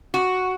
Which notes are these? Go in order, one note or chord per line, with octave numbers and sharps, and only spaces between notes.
F#4